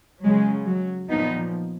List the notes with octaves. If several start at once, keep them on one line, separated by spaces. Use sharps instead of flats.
C#3 F#3 G#3
F#3
A#2 F3 B3 D#4